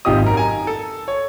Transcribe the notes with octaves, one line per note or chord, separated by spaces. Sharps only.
G#1 C3 F4 G4 D#5 D#6
F#2 A#4
G#5 A#5
A4
C#5